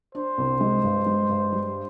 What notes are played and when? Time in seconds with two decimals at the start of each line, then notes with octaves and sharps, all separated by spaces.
0.15 D4 C5
0.38 C2
0.61 G#3
0.83 G2
1.06 G#3
1.29 G2
1.52 G3